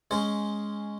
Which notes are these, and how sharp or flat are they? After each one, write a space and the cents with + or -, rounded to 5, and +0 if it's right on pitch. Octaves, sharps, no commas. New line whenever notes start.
G#3 +0 C#4 +5 C5 -5